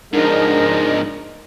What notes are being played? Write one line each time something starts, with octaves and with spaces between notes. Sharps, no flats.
G#2 F3 G#3 D4 D#4 A#4